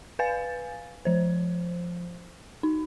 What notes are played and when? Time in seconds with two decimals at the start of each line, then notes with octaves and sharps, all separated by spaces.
0.19 B4 F5 G#5 A6
1.05 F3 C5
2.63 D#4